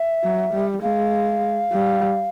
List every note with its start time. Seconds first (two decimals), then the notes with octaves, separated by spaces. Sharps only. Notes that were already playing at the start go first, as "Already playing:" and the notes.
Already playing: E5
0.24 F#3
0.54 G3
0.82 G#3 F5
1.73 G3